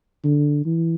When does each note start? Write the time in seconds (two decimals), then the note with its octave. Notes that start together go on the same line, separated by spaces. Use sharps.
0.24 D3
0.65 E3